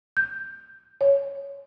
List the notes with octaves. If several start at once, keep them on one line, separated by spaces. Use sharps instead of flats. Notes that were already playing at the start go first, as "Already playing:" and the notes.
G6
C#5